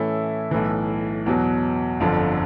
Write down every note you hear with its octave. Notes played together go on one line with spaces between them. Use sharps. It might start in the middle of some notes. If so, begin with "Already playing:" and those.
Already playing: A2 E3 A3 C#4 E4
B1 A2 E3
E2 B2 F#3
G1 F2 D3 F3